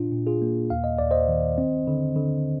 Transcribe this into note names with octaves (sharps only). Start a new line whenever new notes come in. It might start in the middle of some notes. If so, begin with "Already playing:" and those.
Already playing: A#2 D4 F4
A#2
F4 G#4
A#3
D#2 F5
D#5
D#2 D5
C5 D#5
D#3
C4
D3
D3